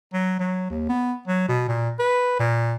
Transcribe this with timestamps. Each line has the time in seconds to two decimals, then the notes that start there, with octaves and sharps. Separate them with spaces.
0.13 F#3
0.40 F#3
0.70 D#2
0.89 B3
1.28 F#3
1.49 B2
1.68 A#2
1.99 B4
2.39 A#2